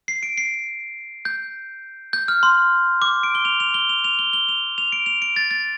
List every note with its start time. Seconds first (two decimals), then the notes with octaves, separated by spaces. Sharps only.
0.08 C7
0.23 D7
0.38 C7
1.25 G6
2.13 G6
2.28 F6
2.43 C6
3.02 D6
3.23 D7
3.35 G7
3.45 F7
3.60 F7
3.74 G7
3.89 F7
4.04 F7
4.19 G7
4.33 G7
4.49 F7
4.78 F7
4.92 D7
5.06 F7
5.22 D7
5.36 A6
5.51 A6